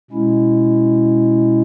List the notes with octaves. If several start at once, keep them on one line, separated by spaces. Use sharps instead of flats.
B2 G#3 C#4 E4